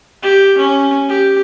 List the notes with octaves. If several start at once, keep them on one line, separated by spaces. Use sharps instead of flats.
G4
C#4
G4